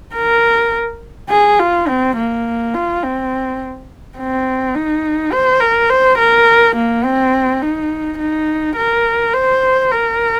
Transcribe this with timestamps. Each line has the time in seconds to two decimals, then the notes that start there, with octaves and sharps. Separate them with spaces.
0.15 A#4
1.30 G#4
1.59 F4
1.88 C4
2.16 A#3
2.74 F4
3.03 C4
4.18 C4
4.75 D#4
5.32 C5
5.60 A#4
5.90 C5
6.18 A#4
6.76 A#3
7.04 C4
7.62 D#4
8.19 D#4
8.76 A#4
9.34 C5
9.91 A#4